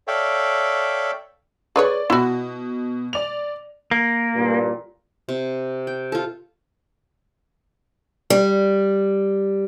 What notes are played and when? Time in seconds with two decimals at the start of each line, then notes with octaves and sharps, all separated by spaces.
0.07 A4 C#5 D5 E5 F5 G5
1.76 G#4 B4 C#5 D5
2.10 B2 E4 F#4
3.13 D5 F7
3.91 A#3
4.36 A1 G2 A#2
5.29 C3
5.87 G5
6.12 F4 A4
8.30 G3